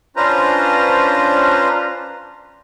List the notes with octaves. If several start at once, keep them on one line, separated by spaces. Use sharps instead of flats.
C#4 D4 F4 B4 C5 A#5